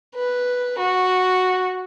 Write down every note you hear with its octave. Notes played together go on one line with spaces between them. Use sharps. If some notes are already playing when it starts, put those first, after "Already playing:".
B4
F#4